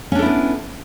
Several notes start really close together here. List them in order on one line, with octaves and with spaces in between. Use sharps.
C#4 D4 A4 E4 B3